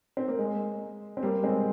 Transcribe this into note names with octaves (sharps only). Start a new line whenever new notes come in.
C4
A#3
G#3
C4
G3 A#3
G#3 C4